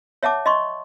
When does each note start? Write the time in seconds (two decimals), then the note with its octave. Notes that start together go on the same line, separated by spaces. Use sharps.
0.23 C#5 E5 F#5 A5 D6
0.46 D#5 C6 C#6